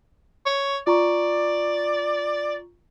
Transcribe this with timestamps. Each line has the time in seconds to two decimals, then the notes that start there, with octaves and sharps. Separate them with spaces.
0.46 C#5
0.87 F4 D5 A#5 C#6